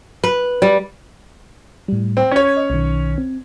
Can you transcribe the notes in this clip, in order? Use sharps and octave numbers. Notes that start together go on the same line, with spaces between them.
B4
G3
A2 G3
C4
C#4 C#5 G#6
D#5
B1 D#3
C4